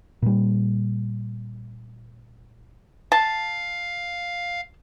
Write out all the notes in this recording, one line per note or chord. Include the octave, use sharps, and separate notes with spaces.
A#2 G3
F5 A5